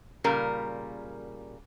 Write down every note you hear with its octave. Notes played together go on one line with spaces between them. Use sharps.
A#2 C#3 G3 A#4